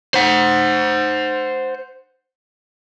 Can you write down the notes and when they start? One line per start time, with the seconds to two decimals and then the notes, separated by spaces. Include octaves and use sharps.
0.14 C5 F#5